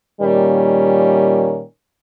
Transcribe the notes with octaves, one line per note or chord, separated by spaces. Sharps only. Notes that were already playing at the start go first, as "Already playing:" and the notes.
A#2 D#3 G3 A#3 C#4 A#4